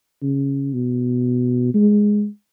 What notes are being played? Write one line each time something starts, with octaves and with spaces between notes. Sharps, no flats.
C#3
B2
G#3